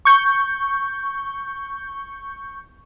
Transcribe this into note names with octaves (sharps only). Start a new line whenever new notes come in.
C#6 G6